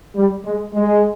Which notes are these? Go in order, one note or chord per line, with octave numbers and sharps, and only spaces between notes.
G3
G#3
G#3